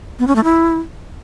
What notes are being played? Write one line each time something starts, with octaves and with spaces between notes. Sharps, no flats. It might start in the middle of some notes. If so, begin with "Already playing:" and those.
B3
C#4
A3
E4